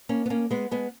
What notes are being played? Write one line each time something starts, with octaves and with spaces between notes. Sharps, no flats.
A#3 C#4
B3
A#3 C#4
G#3 B3
G#3 B3